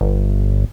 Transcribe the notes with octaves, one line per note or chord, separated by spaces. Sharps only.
G1